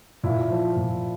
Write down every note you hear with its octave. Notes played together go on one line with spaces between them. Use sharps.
A#2 E4
F3
A#2